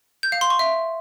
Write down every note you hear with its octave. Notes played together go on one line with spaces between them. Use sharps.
G6
F5
C6
C#6
E5